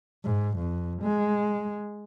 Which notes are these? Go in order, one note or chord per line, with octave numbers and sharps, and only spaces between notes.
G#2
F2
G#3